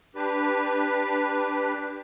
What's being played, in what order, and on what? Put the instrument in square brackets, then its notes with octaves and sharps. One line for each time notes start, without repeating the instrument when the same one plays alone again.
[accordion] D4 G4 B4